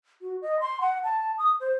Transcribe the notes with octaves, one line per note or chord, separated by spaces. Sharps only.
F#4
D#5
C6
F#5
A5
D#6
C5